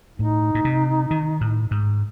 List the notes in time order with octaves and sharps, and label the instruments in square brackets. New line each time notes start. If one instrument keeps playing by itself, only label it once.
[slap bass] A2 [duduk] D#4
[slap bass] A2
C3
D#3
A2
G#2